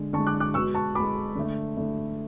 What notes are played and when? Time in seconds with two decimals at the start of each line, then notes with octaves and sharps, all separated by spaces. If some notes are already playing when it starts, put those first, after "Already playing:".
Already playing: D3 G#3
0.13 D3 A5 C#6
0.18 G#3
0.27 D6 F#6
0.40 D6 F#6
0.54 B2 G#3 C#6 E6
0.75 A5 C#6
0.95 B2 G#3 B5 D6
1.35 D3 A3
1.77 D3 A3